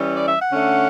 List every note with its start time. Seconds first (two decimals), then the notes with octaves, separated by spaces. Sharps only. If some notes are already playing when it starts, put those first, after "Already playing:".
Already playing: E3 G3 C#4
0.16 D5
0.28 E5
0.40 F#5
0.52 D3 A3 C#4